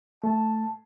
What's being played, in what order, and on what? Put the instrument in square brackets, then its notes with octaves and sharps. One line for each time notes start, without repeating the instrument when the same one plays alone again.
[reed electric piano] A3 [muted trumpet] A5